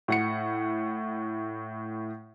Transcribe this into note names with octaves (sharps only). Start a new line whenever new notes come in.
A2 F#5 C#7